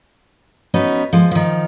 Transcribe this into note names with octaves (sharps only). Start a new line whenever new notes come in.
B3 C#4 D#4 F#4 B4
F3 G#3
D#3 F3